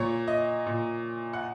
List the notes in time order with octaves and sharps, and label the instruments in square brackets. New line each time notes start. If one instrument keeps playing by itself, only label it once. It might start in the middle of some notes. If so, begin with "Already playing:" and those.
Already playing: [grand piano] A#2 C#5
D#5
A#2
F#5